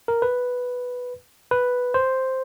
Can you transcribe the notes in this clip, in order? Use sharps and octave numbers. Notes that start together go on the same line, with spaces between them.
A#4
B4
B4
C5